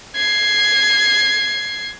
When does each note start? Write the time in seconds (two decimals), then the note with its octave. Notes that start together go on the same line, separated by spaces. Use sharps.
0.16 G#6 C7